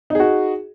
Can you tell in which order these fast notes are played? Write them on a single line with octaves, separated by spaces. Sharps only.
D#4 G#4 F#4